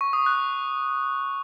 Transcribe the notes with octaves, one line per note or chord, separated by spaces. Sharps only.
C#6
D#6
F#6